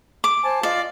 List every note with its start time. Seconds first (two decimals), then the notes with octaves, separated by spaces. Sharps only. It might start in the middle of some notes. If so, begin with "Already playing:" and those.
0.24 D6
0.43 C5 G#5 A5
0.63 F4 D5 D#5